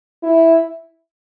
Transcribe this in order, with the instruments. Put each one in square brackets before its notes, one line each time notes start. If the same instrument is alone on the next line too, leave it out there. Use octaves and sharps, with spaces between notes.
[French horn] E4